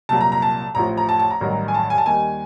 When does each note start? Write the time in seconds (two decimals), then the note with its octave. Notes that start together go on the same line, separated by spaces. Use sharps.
0.09 C2 A#2 F#3 A5
0.21 A#5
0.32 A#5
0.42 A5
0.75 A1 A2 F3 A#5
0.97 A#5
1.09 A5
1.19 A5
1.30 A#5
1.41 A1 G2 D#3 F#3
1.68 G#5
1.74 A5
1.90 G#5
1.98 A5
2.06 D#2 D#3 G3 G#5